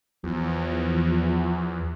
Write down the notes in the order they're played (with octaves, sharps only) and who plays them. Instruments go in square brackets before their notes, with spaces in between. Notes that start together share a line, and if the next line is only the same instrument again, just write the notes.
[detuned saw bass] E2 [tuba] F3